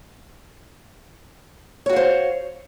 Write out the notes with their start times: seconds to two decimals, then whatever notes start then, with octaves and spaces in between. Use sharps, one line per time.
1.86 C#5
1.89 F#4
1.93 F5
1.96 C5